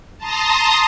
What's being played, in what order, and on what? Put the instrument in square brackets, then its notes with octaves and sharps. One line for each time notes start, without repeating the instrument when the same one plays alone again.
[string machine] A5 A#5 C6 D#6 A#6